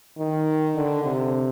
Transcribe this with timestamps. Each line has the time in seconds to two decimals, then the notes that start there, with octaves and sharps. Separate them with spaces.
0.18 D#3
0.76 D3
1.03 C3